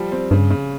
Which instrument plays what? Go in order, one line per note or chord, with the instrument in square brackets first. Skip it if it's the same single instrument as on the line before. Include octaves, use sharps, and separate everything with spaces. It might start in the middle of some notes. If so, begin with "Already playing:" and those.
Already playing: [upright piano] F3 G3
C4
[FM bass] G2 [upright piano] C#3
[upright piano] C#3